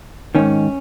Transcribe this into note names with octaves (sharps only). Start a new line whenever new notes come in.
G#2 D#3 C#4